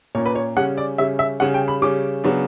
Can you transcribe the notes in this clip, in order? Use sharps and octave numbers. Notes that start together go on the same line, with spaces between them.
A#2 A#3 C#4 C#5
B4
C#5
C#3 G3 C#4 F#5
D5
C#3 G3 C#4 E5
E5
C#3 G3 C#4 F#5
G5
B5
C#3 G3 C#4 D6
C#3 F#3 B3 D4